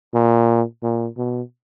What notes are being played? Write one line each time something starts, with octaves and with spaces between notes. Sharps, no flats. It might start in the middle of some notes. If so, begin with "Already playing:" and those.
A#2
A#2
B2